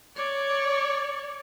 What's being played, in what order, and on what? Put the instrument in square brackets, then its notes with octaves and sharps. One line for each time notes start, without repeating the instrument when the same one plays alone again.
[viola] C#5 D5